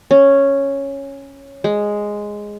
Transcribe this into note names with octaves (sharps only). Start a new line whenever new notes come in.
C#4
G#3